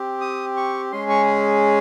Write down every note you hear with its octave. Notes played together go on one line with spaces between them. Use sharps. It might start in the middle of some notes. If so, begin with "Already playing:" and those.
Already playing: C4 G4
D#6
C#6
G#3 C#4 G#4 C6
C#6